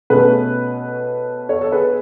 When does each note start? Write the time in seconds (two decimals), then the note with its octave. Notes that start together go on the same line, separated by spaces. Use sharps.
0.10 B2 A3 C#4 G#4 B4
1.49 A4 C#5
1.61 A4
1.72 G#4 B4